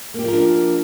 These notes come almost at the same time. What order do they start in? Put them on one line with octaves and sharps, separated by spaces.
A#3 G4 F3 A#4 D4